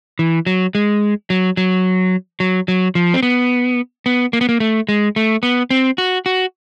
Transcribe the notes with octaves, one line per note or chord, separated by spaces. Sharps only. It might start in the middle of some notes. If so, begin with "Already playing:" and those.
E3
F#3
G#3
F#3
F#3
F#3
F#3
F3
C4
B3
B3
A#3
B3
A#3
A3
G#3
A3
B3
C4
F#4
F#4